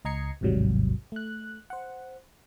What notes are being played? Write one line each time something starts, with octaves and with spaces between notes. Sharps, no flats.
C#2 D#5 A#5 G#6 C7 C#7
A1 D#2 G#2 C3 F#3 G3
A3 F#6
C5 F#5